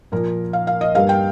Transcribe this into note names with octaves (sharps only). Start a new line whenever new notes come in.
A#2 F3 A#3 A#4
F5
F5
D#5
G2 G3 A#3 F5
G5